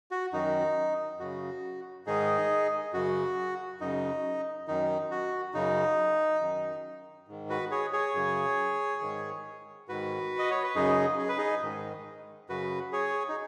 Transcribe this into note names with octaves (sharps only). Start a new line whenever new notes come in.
F#4
F#2 D#3 D#4
F#2 C#3 F#4
G#2 D#3 D#4 G#4
F#2 C#3 F#4
F#2 C#3 D#4
F#2 D#3 D#4
F#4
F#2 C#3 D#4
F#2 D#3
G#2 D#3
F#4 B4
G#4 C#5
G#4 C#5
F#2 C#3
G#2 D#3
G#2 D#3 F#4 B4
D#5
C#5
B4
F#2 C#3 D#4 G#4
G#4
B4
D#4 G#4
G#2 D#3
F#2 C#3 F#4 B4
G#4 C#5
D#4